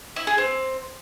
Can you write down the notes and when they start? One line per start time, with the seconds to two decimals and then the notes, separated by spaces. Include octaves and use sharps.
0.16 E4
0.27 G#4
0.38 C4